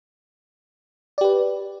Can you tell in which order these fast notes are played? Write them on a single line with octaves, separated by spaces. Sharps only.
D5 G4 B4